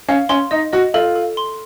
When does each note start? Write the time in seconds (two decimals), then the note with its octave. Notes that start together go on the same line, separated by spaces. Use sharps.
0.08 C#4 F5
0.29 C#4 C6
0.51 D#4 D#5
0.73 F#4 D#5
0.94 F4 A4
1.16 A4
1.37 C6